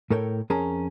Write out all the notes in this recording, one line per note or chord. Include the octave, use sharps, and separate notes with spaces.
A2 A4 A#4 C#5 G5
F2 C#4 G#4 A#4 A5 A#5